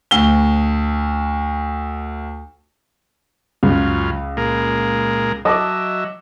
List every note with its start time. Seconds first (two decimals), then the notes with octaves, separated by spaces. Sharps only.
0.11 D2 G7
3.63 C#2 F#2 C#3 F4
4.37 A#2 G#3 A#4
5.45 F#3 D#5 E5 A5 D6